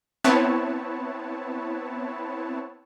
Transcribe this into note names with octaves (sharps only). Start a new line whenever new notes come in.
B3 C4 E4 B4 C#5 A5